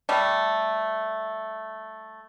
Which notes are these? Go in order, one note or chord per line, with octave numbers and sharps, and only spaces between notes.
G3 A3